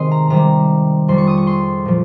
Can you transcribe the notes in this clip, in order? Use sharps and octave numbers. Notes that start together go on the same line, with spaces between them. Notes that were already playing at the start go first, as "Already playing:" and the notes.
Already playing: C3 D#3 G#3 C6 D#6
A#5
C3 D#3 G3 A#5
F2 C#3 G3 C6
C#6
D#6
C#6
C6
A#2 F3